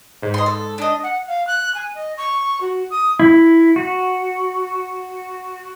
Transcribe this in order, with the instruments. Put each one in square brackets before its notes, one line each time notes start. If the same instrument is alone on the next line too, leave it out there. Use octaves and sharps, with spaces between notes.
[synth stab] G#2
[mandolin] D#5 C6
A4
D4 D#5
[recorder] F#5
F5
F#6
G#5
D#5
C#6
F#4
D#6
[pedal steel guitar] E4
F#4